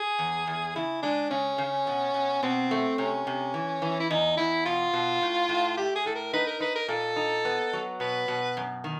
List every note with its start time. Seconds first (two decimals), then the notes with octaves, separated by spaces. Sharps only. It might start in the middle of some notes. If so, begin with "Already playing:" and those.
Already playing: G#4
0.19 E2
0.47 E2
0.76 C#3 E4
1.02 G#3 D4
1.30 C#3 C#4
1.58 C#3
1.87 B2
2.14 B2
2.43 B2 C4
2.71 A3
2.98 C3 C#4
3.27 C3
3.54 E3
3.82 E3
4.00 E4
4.10 E2 D#4
4.37 E2 E4
4.65 B2 F4
4.93 B2
5.22 A2
5.49 A2
5.77 A3 G4
5.96 G#4
6.06 A2 A4
6.15 A#4
6.33 D#4 B4
6.47 A#4
6.60 D#4 B4
6.75 A#4
6.88 A#2 A4
7.16 D#4
7.45 B3
7.73 F#3
8.00 B2 B4
8.28 B2
8.57 F#2
8.84 D#3